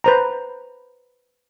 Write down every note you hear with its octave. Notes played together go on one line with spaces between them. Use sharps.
B4 C5 A#5